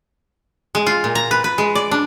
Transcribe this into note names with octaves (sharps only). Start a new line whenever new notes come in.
G#3
F4
A#2
A#5
B4
B4
G#3
D5
D4